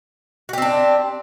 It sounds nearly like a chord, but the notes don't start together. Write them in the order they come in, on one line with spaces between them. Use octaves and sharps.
F#4 G4 C4 D4